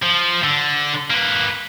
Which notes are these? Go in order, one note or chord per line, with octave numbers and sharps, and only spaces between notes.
F3
D3
A#3 B4